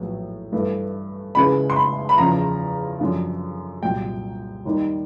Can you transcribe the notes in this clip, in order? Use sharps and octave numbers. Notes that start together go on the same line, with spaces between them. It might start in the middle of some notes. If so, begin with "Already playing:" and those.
Already playing: A#1 A2 F#3 B3
G2 E3 A3
C#2 C#3 E3 G#3 B5
C6
B5
B5
E2 C#3 F3 A#5
F#2 D3 F3
C2 A#2 F#3 G5
D#2 D#3 G3